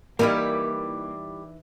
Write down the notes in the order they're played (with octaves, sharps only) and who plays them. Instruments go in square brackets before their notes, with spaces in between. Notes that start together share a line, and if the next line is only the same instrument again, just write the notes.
[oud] E3 D#4 A#4 [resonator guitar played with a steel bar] G3 E4 G4 [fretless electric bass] A#3